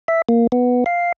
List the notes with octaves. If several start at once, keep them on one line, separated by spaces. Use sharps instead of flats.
E5
A#3
B3
F5